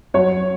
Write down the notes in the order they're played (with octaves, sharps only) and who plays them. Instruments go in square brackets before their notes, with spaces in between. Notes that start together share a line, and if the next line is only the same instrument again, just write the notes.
[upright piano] F#3 C#5